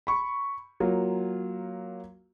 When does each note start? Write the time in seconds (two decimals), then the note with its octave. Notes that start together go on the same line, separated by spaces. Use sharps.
0.07 B5 C#6
0.80 F#3 A#3 F4